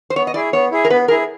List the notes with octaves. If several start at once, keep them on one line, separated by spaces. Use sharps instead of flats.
C5
B3 C#5
D#5
E4 G#4 D5
B3 C#5
E4 G#4
A#4
B3 B4
E4 G#4 A#4